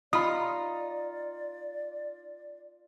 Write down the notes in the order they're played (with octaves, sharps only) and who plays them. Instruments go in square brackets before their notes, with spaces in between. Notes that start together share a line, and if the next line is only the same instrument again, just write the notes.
[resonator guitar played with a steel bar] D#4 [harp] F4 [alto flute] D5 [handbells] B5 D#6